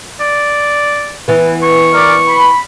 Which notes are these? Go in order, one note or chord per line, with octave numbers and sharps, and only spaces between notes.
D5
E3 B3
C#6
A#4 D5
B5